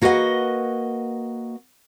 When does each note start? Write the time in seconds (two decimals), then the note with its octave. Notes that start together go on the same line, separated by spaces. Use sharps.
0.01 A#3 F#4 B4 C5 D#5 F#5